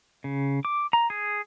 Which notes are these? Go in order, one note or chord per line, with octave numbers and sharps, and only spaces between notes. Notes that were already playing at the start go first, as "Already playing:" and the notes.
C#3
D6
A#5
G#4